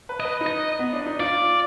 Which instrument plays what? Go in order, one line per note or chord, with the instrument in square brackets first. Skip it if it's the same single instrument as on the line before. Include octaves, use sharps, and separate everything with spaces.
[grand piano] B4
[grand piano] B4 [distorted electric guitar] D#5
[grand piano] D#4
[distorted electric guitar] D#5
[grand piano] B3
D4
D#4
[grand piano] F4 [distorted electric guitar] D5